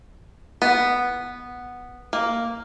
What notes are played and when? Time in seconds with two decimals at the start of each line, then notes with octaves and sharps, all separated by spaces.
0.62 B3
2.13 A#3